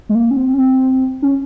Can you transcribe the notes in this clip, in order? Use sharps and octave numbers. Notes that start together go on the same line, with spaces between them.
G#3
A#3
C#4
C4
C#4
C4
C#4